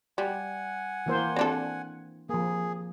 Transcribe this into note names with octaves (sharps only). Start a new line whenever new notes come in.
G3 F#5 G#5
E3 A#3 C5
C4 D4 A4
F3 A#3 G#4